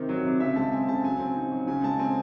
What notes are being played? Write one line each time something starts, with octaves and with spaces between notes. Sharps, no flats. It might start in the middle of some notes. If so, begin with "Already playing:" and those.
Already playing: C3 D#3 C4
F#3
C3
C#3 E5
G#3 A5
C4 G#5
C#3 A5
F#3 G#5
C4
D#4
F#3
C#3 G#5
G#3 A5
C4 G#5